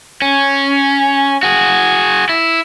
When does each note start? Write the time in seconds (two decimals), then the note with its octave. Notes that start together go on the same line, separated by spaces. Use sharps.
0.22 C#4
1.43 F#4 G#4
2.29 E4